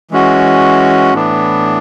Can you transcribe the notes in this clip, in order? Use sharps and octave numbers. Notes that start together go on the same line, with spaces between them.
E3 G#3 C#4 F#4
A2 E3 B3 D4